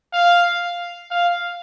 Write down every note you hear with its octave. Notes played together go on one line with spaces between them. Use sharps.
F5
F5